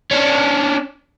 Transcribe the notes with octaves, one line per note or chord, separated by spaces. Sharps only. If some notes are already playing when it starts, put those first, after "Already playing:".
C#4 D4